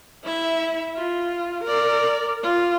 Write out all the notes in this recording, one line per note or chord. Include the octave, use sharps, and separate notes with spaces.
E4 E5
F4
A#4 D5
F4